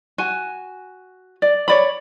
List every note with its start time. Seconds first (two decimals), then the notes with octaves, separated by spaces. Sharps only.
0.18 F#4 G#5
1.42 D5
1.68 C#5 D5 B5